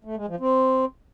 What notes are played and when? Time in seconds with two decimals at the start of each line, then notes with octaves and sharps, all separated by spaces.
0.04 A3
0.16 G#3
0.28 F3
0.40 C4